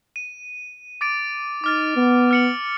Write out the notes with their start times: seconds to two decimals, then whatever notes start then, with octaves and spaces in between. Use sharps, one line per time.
0.16 D#7
1.01 D6 A6 D7
1.64 D#4 D6 F6 A6
1.96 B3
2.31 F6 C#7 F#7